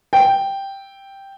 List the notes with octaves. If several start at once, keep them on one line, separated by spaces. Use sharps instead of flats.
G5